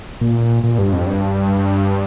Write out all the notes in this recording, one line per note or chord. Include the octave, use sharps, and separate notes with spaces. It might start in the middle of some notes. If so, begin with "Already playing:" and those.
A#2
A#2
G2
F2
G2